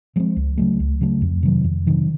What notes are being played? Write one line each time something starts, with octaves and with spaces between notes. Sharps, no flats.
F3 G#3 C4
C#2
C#3 F#3 A3
C#2
C#3 F#3 A3
F2
C3 D#3 F#3
F2
C3 D#3 F#3